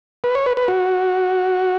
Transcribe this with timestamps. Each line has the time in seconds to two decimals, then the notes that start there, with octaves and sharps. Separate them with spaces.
0.24 B4
0.35 C#5
0.46 B4
0.57 B4
0.68 F#4